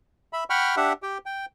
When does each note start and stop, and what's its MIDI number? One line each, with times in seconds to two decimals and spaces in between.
0.33 0.44 76
0.33 0.44 83
0.50 0.75 78
0.50 0.75 79
0.50 0.75 83
0.50 0.75 85
0.50 0.75 89
0.77 0.93 62
0.77 0.93 67
0.77 0.93 76
0.77 0.93 78
1.03 1.18 67
1.03 1.18 79
1.26 1.45 79